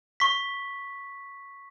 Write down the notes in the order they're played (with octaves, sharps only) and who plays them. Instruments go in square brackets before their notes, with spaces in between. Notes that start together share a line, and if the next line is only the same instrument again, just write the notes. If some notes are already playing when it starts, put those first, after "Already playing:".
[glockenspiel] C#6 B6